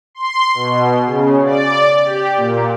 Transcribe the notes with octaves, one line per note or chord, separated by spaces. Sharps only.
C6
B2
C#3
D5
G4
A#2